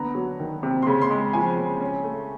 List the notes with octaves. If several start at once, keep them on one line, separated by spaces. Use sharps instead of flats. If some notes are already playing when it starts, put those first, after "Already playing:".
Already playing: D3 B3 A#5
F#3
D#3
C3
C6
C#3 B5
C6
G#3
F3 G#5
C#3
C#4
A3